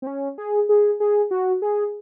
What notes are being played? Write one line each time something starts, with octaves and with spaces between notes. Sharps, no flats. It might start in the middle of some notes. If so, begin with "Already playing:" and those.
C4
C#4
G#4
G#4
G#4
F#4
G#4